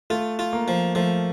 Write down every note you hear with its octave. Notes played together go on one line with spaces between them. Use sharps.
A3 F4
F4
A#3
F3
F3 A3